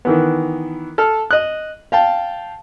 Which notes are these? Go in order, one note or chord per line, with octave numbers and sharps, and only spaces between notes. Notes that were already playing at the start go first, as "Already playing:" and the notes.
D#3 E3 B3
A4 A5 F6
D#5 F#6
F5 G5 A5